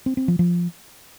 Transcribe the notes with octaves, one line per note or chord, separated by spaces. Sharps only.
C4
C4
F3
F3